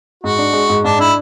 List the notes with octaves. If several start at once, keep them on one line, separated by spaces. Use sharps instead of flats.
G#2 F#4
D4
G#3
G#2
G#2 D4
D4 E4